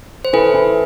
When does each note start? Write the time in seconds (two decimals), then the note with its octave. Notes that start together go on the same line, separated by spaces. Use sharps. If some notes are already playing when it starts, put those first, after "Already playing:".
0.25 C5
0.33 E3 A4 B4
0.54 E3